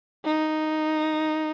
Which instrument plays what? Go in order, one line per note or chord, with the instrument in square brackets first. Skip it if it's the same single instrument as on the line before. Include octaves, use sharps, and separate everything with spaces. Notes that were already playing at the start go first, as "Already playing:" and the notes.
[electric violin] D#4